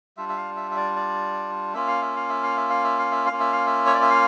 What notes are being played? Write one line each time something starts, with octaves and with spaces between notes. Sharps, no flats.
G3 D4 F4 E5
E5
F5
E5
E5
D5
D5
A#3 C#4 F4 E5
F5
E5
F5
E5
F5
E5
F5
E5
F5
E5
F5
A#3 C#4 F4
E5
F5
E5
C#5
D5
E5
F5